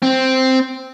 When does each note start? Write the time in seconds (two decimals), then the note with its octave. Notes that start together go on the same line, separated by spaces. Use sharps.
0.02 C4